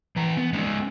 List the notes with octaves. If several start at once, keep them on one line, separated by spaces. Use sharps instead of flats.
E3 A#5
B3
G#3 C#4 D#4